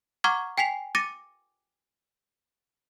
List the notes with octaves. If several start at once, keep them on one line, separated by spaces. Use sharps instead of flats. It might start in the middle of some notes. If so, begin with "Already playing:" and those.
F#5 A#5 C#6 D6 F6 G#6
G5 G#5 B6 C7 F7
D6 A6 A#6 C#7 D#7